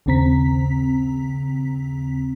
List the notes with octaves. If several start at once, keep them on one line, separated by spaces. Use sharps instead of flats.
A#1 D#2 C#3 C4 A#5 B6